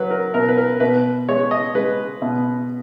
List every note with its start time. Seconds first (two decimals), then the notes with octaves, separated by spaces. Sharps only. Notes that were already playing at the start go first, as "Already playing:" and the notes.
Already playing: F#3 B4
0.11 A#4
0.34 B2 A#4
0.48 B4
0.58 A#4
0.80 B2 B4
1.29 G#3 C#5
1.51 D#5
1.75 G#3 B4
2.22 B2